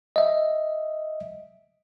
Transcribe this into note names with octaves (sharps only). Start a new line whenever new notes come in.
D#5 E5